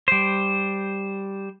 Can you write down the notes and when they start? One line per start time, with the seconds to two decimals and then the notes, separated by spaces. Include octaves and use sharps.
0.08 G3 C5